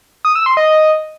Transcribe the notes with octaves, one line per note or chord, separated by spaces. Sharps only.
D#6
E6
C6
D#5